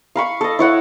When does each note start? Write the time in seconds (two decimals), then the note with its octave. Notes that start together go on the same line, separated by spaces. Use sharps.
0.16 F5 B5 C#6
0.41 A4 D#5
0.59 E4 C#5 F#5